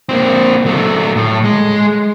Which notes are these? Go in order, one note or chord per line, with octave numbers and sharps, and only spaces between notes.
A#3 C4
F#3 A3
A2
G#3